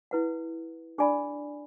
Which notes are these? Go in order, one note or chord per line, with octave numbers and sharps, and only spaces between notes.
E4 B4 F#5
D4 G#4 D5 G#5 B5